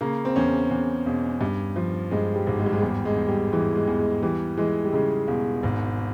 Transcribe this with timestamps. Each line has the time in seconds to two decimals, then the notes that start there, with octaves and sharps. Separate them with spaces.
0.01 C#3 A#3
0.25 C4
0.36 E2 C#4
0.71 E2
1.06 E1
1.41 G2
1.76 F3
2.11 G2 G#3
2.36 G3
2.47 G#1
2.59 G#3
2.66 G3
2.73 G#3
2.81 E2 G3
3.05 G#3
3.17 E2
3.28 G3
3.52 E3 G#3
3.76 G#3
3.87 E2
3.99 G#3
4.23 E3 G3
4.57 E3 G#3
4.84 G3
4.92 C#3 G#3
5.28 E1
5.63 G#1